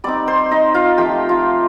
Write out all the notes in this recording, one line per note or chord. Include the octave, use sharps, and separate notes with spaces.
G3 C4 D#4 D5 D6
C5 C6
D#4 D#5
F4 F5
F3 A3 D#4 G4 G5
F4 F5